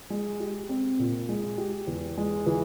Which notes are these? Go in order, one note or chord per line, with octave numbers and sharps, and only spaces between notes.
G#3
G4
C4
A#2
G#3
G4
E2
G#3
E3